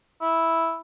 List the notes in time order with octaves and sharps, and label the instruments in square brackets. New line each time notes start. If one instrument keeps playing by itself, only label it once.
[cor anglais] E4